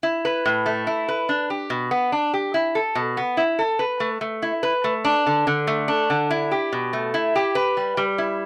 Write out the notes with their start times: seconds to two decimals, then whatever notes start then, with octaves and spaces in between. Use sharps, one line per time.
0.03 E4
0.25 B4
0.46 A2
0.66 A3
0.87 E4
1.08 B4
1.29 D4
1.50 G4
1.70 B2
1.91 B3
2.12 D4
2.33 G4
2.54 E4
2.75 A4
2.95 B2
3.17 B3
3.37 E4
3.59 A4
3.79 B4
4.00 A3
4.21 A3
4.42 E4
4.63 B4
4.84 A3
5.05 D4
5.27 D3
5.47 D3
5.67 A3
5.88 D4
6.10 D3
6.31 E4
6.51 G4
6.73 B2
6.93 A3
7.14 E4
7.36 G4
7.55 B4
7.77 G3
7.97 G3
8.18 E4